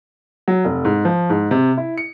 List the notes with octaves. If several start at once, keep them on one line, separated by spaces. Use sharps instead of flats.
F#3
F1
G#2
F3
G#2
C3
E4
C#7